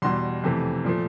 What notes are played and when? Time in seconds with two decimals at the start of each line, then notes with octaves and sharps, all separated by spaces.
0.02 E2 B2 G3 C6
0.44 F2 C3 E3 A3
0.84 A#2 F3 A3